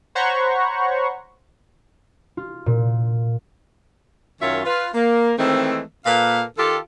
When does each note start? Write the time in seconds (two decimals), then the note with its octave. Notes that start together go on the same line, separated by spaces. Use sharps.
0.15 C5 C#5 F#5 A#5 B5 C#6
2.37 F4
2.66 A#2
4.41 F#2 D#3 C#4 F4 C#5 E5
4.65 F4 B4
4.94 A#3
5.37 D#3 E3 G#3 A3 C4
6.05 A#2 A#3 A4 B4 F5
6.57 D#3 F4 G4 A4